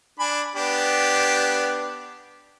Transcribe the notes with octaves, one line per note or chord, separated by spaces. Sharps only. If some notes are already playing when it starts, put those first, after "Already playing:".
D4 G#5 B5
B3 D4 G4